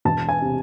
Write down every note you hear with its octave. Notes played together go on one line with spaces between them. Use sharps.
E1 A5
G#5
C3